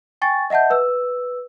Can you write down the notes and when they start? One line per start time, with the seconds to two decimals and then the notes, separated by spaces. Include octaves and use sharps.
0.22 G5 G#5 C#6 A6
0.50 D#5 E5 F#5 A5 G6
0.70 B4 E6